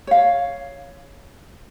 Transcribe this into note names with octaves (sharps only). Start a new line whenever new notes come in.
C#5 F5